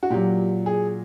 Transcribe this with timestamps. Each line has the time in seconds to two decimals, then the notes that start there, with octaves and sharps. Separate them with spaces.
0.03 F#4
0.10 A#2 F#3 G4
0.66 G#4